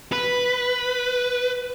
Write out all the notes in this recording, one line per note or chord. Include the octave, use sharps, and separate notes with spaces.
B4